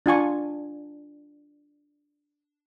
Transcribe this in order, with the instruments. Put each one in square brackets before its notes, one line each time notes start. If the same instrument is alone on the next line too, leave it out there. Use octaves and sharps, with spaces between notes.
[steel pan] D4 F4 G#5 C#6